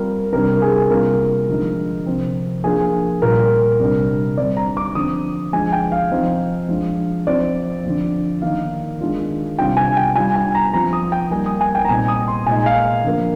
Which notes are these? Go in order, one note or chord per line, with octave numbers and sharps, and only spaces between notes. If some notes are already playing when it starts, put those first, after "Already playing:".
Already playing: G3 C4 F4 A#4
C3 G3 D4 A#4
G#4
C3 G3 A#3 D4 F4 A#4
D3 F3 G#3 D#4
C3 F3 C4
F3 A#3 D4 F4 G#4
A#2 G3 A#3 A#4
C3 G3 D4
D3 G3 C4 D5
A#5
D6
D3 F3 C4 D#6
F3 G#3 D4 G#5
G5
F5
F3 C4 D#4
F3 G#3 D4
F3 C4 D#4 D5
D3 F3 C4 F4
D#3 A#3 D#4 F5
D#3 G#3 D4 F4
C3 G3 D4 F4 G5
G#5
G5
G3 D4 F4 G#5
G#5
A#5
F3 C4 F4 A#5
D#6
G5
G3 A#3 D#4 G#5
D#6
G#5
G5
A#5
A#2 G3 C4 D#4 G#5
D#6
C6
A#2 G#3 D#4 G#5
F5
D3 F3 A#3